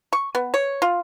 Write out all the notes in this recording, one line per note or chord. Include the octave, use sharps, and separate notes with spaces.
C#6
B3
C#5
F4